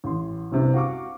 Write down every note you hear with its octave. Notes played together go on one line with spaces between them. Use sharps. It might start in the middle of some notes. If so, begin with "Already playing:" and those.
A1 C6
C2 G2 C3
F#4 F5 C#6 D6